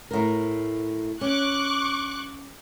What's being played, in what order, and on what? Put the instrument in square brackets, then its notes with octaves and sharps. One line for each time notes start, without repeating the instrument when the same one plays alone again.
[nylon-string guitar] A2 A#4
[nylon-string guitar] C#4 [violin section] C#6 D6 F#6